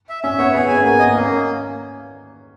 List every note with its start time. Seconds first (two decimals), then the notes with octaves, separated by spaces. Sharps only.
0.09 E5
0.23 C#4 E5
0.38 B3 C#5
0.54 B3 G#4
0.68 C#4 G#5
0.77 B3
0.84 A#3 G#5
0.99 B3 D#5
1.14 A#3 C#4